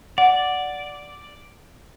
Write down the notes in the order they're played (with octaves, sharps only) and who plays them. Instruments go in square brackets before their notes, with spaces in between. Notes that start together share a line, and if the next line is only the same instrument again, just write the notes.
[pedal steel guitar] D5 [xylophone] F#5